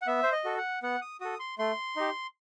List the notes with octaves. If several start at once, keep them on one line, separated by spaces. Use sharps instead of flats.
F#5
B3 E5
C5
D#5
F#4 A4
F#5
B3 F#5
D#6
F#4 A4 D#6
C6
A3 C6
D#4 G4